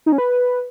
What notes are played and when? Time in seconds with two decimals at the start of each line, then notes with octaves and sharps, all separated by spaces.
0.06 D#4
0.12 C#4
0.18 B4